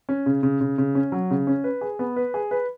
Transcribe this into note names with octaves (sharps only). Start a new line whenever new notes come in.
C#4
C#3
C#3
C#3
C#3
C#4
F#3
C#3
C#4
B4
G#4
B3
B4
G#4
B4